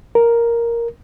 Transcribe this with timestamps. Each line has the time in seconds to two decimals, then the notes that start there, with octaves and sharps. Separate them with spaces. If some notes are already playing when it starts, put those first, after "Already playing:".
0.15 A#4